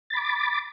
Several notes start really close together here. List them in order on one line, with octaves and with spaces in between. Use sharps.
A6 B5 D6